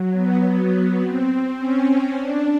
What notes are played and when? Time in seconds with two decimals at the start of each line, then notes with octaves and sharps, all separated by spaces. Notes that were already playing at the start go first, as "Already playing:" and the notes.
Already playing: F#3
0.12 B3
0.99 C4
1.57 C#4
2.16 D4